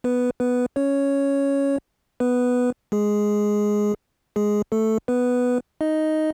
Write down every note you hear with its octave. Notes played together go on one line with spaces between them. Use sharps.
B3 B4
B3 B4
C#4 C#5
B3 B4
G#3 G#4
G#3 G#4
A3 A4
B3 B4
D#4 D#5